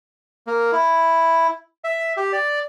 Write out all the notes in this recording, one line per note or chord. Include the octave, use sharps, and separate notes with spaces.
A#3
E4
E5
G4
D5